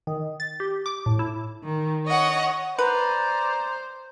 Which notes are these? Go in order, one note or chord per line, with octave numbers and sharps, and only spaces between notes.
D#3
A6
G4
D6
A2
E4
D#3
C#5 D#5 F#5
B4 C5 D5 A#5